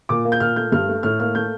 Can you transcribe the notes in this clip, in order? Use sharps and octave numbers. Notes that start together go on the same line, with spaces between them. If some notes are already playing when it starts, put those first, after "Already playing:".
A#2 D6
A#3
G6
A#2 F6
A3 G6
G2 F6
A3
A2 F6
A#3 F6
A3 G6